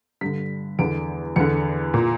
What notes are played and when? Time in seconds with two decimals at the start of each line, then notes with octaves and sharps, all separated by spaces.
0.21 G2 D3 B6
0.79 E2 D3 D7
1.36 E2 D3 C#7
1.94 A#2